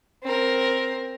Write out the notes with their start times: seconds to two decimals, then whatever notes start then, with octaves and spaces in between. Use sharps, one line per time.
0.23 C4 A#4